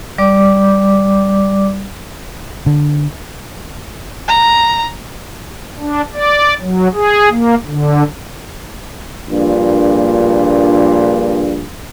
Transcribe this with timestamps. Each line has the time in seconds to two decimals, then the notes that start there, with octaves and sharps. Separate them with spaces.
0.18 G3 D5 D6
2.66 D3
4.28 A#5
5.80 D4
6.14 D5
6.61 F#3
6.94 G#4
7.30 A#3
7.66 D3
9.30 A#1 G2 A#2